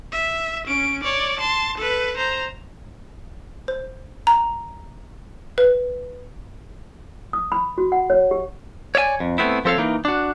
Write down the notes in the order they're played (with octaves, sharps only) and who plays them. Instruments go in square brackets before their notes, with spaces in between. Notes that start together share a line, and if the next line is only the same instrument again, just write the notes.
[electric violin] E5
C#4 D7
C#5 D5
A5 C6
A4 B4
C5 A#5
[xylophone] C5
A#5
B4
[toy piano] D#6
B5
F#4
F#5
C#5
G4
[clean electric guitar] C#5 D5 E5 G#5
F2
A3 B3 C4 E4
F3 C4 A4 C#5 F5
E3 A#3 D#4
D4 F#4